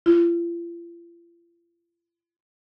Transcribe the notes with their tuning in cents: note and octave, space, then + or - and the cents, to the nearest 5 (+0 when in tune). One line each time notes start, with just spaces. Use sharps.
F4 -45